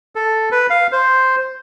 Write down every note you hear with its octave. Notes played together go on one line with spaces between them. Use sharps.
A4
B4
F5
C5